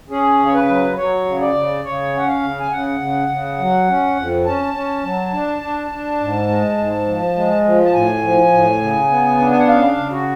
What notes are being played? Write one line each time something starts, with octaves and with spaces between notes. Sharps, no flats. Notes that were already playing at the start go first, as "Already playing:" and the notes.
C#4 G#4
C#3
C#5
B4
F#3
F#3 C#5
C#3
D5
C#3
C#3 C#5
C#4 F#5
F5
C#3
G#5
C#3 F#5
C#3
C#3
F#3
C#4
F2
C#4 A5
C#4
F#3
D4
D4
D4
G#2
G#3
G#2
F3
G#3
F3
A5
A2 G#5
F3
A2
C#3
B3
D4
G#5
F#5
C#3 F5
C#3
F#4